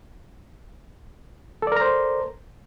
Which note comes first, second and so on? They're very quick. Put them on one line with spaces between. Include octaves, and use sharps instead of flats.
A4 D5 A#4 A#5 C5